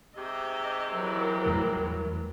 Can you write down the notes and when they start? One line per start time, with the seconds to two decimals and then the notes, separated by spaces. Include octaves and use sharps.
0.17 G#2 C3 G4 D#5 E5
0.93 E3 F#3 A#4
1.46 E2 G3 A3